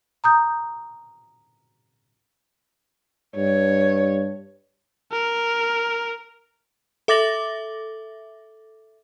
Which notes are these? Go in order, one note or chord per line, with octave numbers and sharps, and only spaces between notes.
A#5 D#6 G6
G2 C#5
A#4
A4 E5 D6 A6 A#6 F#7